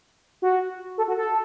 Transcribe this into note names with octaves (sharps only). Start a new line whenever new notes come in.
F#4
A4
F#4
A4